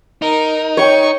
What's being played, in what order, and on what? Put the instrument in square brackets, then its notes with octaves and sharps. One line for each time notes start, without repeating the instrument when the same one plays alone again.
[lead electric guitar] D#4 [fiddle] A#4
[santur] C#5 G5 [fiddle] C#6